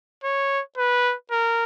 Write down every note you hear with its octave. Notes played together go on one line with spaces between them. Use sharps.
C#5
B4
A#4